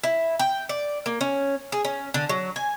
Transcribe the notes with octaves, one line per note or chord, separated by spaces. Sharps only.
E4
G5
D5
A#3
C#4
G#4
C#4
D3
F#3
G#5